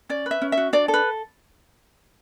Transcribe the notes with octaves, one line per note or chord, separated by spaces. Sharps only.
C#4 D5
B4 E5
C#4
E5
F#4
D4 D5
A4
B4